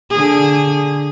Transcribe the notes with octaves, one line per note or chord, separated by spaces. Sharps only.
D3 G#4